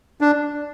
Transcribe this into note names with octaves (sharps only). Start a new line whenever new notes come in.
D4